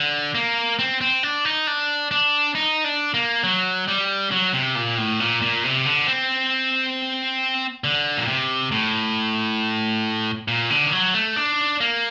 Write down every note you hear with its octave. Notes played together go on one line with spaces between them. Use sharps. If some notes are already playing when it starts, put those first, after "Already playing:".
Already playing: D3
A#3
C4
C4
D4
D#4
D4
D4
D#4
D4
A#3
F#3
G3
F#3
C3
A#2
A2
A#2
A#2
C3
D3
C4
D3
A#2
C3
A2
A#2
D3
D#3
F#3
A3
D4
A#3